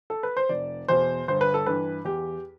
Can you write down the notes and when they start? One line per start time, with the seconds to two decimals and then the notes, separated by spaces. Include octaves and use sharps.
0.10 A4
0.23 B4
0.37 C5
0.49 F1 D5
0.88 E2 B2 C5
1.28 G1 C5
1.41 B4
1.54 A4
1.66 G2 E3 B4
2.05 E2 G4